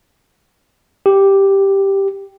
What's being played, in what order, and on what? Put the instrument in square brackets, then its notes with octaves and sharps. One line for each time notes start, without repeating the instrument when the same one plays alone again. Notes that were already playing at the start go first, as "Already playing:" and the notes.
[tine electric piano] G4